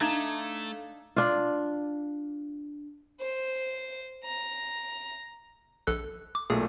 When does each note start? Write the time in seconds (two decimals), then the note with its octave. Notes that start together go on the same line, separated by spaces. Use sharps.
0.01 A3 D4 D#4 F5 A5 A#5 G#6
1.16 D4 F4
3.20 C5
4.24 A#5
5.87 A#1 A4 F#6
6.35 D6
6.50 B1 A#2 A3 G#4